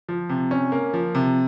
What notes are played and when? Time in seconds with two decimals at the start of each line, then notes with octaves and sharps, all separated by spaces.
0.09 F3
0.29 C3
0.51 C#4
0.72 A#3
0.94 F3
1.15 C3